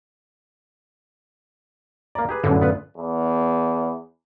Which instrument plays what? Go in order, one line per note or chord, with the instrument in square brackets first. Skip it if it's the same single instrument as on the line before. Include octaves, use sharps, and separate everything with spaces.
[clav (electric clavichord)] A#3 D5 [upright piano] A#5
[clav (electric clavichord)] G4 G#4 B4
[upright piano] F#2 A2 [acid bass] D3
[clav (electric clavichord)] B3 F4 B4
[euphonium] E2